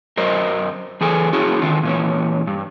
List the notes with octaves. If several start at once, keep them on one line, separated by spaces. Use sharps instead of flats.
F#2 A#4 C5 D#5
E3 G#4 A4 G#5
C#4 E4 F#4 G#4
D3 D#3 F4
A#2 E3 C#4
G2